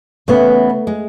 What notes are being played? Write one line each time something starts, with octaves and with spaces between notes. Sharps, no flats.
C#3 E3 A3 B3
G#3